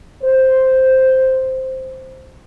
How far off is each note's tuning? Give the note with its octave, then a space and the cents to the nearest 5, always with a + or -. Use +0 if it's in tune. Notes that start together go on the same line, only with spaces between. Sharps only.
C5 +0